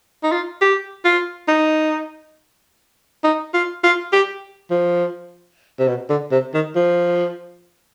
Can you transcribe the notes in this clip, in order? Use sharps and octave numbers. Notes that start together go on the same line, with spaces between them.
D#4
F4
G4
F4
D#4
D#4
F4
F4
G4
F3
C3
B2
D3
C3
D#3
F3